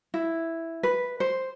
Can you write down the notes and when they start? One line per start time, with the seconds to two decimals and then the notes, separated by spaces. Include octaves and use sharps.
0.14 E4
0.83 B4
1.20 C5